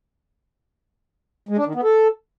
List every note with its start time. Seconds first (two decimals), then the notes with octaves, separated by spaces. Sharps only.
1.49 G#3
1.58 D4
1.66 D#3
1.75 B3
1.84 A4